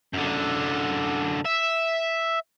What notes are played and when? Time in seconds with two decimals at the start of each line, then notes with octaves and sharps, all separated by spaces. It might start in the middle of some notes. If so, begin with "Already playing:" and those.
0.13 F#2 D3
1.46 E5